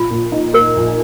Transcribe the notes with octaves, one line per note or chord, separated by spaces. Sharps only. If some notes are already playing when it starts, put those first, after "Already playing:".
Already playing: A#1 F4
A#2
D#4
A#3 A#4
A#1